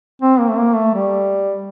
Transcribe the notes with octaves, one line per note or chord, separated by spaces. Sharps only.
C4
A#3
A3
A#3
A3
G3